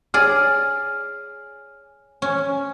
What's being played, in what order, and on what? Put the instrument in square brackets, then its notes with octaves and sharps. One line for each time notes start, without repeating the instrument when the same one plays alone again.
[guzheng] G#4 D5 [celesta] C#5 G#5 F6
[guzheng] C#4